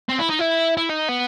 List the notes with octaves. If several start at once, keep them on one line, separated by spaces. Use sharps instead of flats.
C4
E4
D#4
E4
E4
D#4
B3